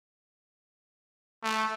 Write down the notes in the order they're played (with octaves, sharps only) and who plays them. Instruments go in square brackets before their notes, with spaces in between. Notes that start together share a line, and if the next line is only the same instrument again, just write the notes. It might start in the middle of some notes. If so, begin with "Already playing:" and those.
[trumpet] A3